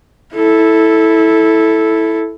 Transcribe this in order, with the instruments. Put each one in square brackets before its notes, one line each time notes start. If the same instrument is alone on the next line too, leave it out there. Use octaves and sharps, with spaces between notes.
[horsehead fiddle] E4 A4